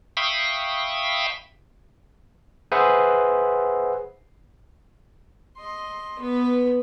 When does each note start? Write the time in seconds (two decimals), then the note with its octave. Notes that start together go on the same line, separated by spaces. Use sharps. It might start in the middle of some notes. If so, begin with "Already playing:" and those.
0.17 E5 F5 G5 B5 C#6 D#6
2.72 G#4 B4 C5 E5 F#5
5.57 D#5 C6
6.20 B3 B4